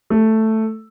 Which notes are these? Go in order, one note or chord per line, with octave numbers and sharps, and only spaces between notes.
A3